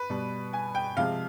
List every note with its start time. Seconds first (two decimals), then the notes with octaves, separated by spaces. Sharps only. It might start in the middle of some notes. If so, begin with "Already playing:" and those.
Already playing: B4
0.10 B2 G3
0.53 G#5
0.75 G5
0.97 C3 F3 G#3 F5